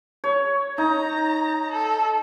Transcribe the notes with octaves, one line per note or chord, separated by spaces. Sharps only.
C#5
D#4 A#5
A4